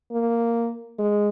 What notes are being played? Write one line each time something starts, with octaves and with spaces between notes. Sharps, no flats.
A#3
G#3